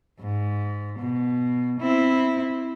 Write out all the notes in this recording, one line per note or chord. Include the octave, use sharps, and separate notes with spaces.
G#2
B2
C4 E4